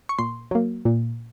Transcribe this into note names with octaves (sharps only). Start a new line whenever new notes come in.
C#6
A#2 C6
F#3 A#3
A#2